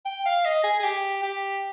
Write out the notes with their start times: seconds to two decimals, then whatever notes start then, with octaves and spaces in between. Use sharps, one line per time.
0.05 G5
0.26 F5
0.45 D#5
0.64 G#4
0.79 G#4
0.84 G4
1.23 G4